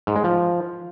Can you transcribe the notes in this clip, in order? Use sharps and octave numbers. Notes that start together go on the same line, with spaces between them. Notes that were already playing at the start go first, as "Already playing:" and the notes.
G#2
G#3
F3